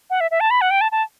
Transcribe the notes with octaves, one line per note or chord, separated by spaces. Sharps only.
F#5
E5
E5
A5
B5
F#5
G5
A5
A5